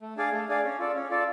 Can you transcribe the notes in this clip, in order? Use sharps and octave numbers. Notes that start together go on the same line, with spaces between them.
A3
D4 G#4 D5 F5
A3
D4 G#4 D5 F5
C#4
F4 A4 D5
C#4
F4 A4 D5